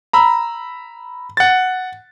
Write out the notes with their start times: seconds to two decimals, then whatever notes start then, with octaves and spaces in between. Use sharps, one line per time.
0.13 A#5 B5 E6
1.37 F#5 A6